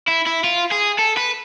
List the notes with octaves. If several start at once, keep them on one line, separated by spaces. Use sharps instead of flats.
E4
E4
F4
G#4
A4
B4